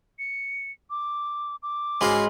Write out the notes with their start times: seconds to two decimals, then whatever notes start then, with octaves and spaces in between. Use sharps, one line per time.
0.19 C#7
0.90 D6
1.63 D6
2.01 G#2 C#4 F#4 F5 G#5 B5 C6